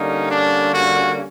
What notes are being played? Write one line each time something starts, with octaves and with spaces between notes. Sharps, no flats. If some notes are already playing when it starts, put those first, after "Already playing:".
Already playing: D3 G3 A#3 C#4 D#4
D4
F#4